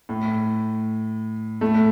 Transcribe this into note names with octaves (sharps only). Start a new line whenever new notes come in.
A2
A2 A3